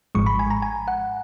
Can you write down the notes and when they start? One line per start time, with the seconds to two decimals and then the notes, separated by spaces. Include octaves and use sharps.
0.15 G#1 G#2 F3 G#3 C#6
0.26 B5
0.39 G#5
0.50 A#5
0.62 G#5
0.88 F#5